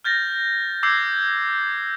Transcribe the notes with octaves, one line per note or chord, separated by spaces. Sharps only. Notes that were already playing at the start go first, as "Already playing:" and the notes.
F6 G6 A6 A#6
D6 E6 G6 G#6 C7